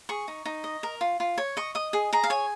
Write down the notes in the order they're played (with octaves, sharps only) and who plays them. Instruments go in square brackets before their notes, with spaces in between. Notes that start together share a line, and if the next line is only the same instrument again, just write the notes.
[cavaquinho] G#4 C#6
D#4
D#4
D#5
A#4
F4
F4
C#5
D#5 C#6
D#5 D#6
G#4
G#4 A#5
F5
C#5 G#5